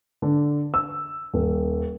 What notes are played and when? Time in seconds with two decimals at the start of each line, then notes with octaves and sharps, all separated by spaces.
0.22 D3
0.74 E6
1.34 D#1